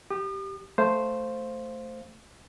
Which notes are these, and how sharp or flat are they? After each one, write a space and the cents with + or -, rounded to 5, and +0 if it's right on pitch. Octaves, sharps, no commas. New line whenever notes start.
G4 -10 D#6 -45
A3 +0 C5 +0 F5 +0